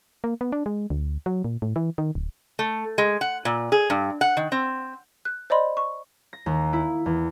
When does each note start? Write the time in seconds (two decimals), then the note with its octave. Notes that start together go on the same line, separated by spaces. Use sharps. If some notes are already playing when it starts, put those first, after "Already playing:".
0.24 A#3
0.41 B3
0.52 D4
0.66 G#3
0.90 D2
1.26 F#3
1.44 A#2
1.62 A2
1.76 E3
1.98 D#3
2.15 D1
2.59 A3
2.98 G#3
3.21 F#5
3.45 A#2
3.72 G#4
3.90 G2
4.21 F#5
4.37 D#3
4.52 C4
5.25 F#6
5.50 C5 D5 D#5 B5 C6
5.77 C#6
6.33 A#6
6.46 D#2
6.73 E4
7.06 E2